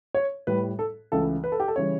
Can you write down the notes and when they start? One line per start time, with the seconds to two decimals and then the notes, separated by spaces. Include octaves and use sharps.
0.15 C#5
0.47 A2 G3 B4
0.79 A4
1.12 C#2 C#3 E3 A3 A4
1.44 B4
1.52 A4
1.60 G4
1.68 A4
1.76 C#3 E3 G3 C#5